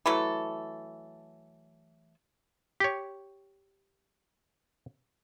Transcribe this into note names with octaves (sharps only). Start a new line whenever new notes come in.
E3 F#3 A3 A4
G4 C#5